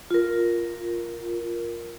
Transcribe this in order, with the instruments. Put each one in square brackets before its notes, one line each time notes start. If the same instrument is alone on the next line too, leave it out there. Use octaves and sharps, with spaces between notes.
[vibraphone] F4 A#4